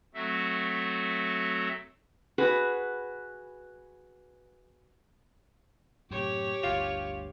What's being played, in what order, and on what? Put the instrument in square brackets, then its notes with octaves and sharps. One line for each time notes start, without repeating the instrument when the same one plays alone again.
[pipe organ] F#3 A3 C4 F#4 A4 E5
[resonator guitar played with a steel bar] F#4 G#4 B4
[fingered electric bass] F#2 A2 C3 [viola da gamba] G4 C#5
[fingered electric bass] G1 D2 G2 [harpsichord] F4